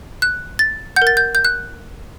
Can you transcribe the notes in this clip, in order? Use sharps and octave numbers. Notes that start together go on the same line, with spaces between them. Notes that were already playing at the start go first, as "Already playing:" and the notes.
F#6
A6
F#5 G6
A#4
A6
G6
G6
F#6